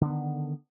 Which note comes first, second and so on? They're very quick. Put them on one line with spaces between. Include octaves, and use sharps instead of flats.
D3 B3 D#3